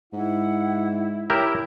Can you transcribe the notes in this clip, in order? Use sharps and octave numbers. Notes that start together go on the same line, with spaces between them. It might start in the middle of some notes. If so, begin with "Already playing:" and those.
G#2 E4 F#5
E4 G4 A#4 C#5